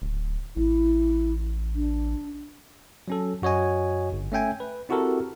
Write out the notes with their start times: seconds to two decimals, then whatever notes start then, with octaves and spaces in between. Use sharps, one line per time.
0.02 D1
0.57 A1 E4
1.75 D4
3.08 F#3 C#4 A4
3.42 F#2 F#4 C#5 D#5 G#5
4.12 G1
4.32 A3 C#4 E5 G5 G#5
4.60 B4
4.89 C4 E4 F#4 G4 A4 A#4